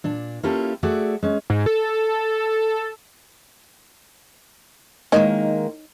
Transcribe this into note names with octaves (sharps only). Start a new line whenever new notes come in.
A#2 D4
A#3 C#4 E4 F4 G4 A4
A3 F#4 G#4 D5 E5
G#3 C#4
G#2
A4
D#3 G#3 A#3 D#4 C#5 D#5